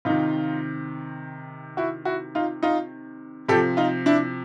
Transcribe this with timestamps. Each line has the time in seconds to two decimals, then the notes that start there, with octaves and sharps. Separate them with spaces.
0.05 C3 D#3 D#4 F4
1.77 E4 F#4
2.05 E4 F#4
2.35 D#4 F4
2.63 D#4 F4
3.48 C3 F3 G4 A4
3.77 D#4 F4
4.06 D4 E4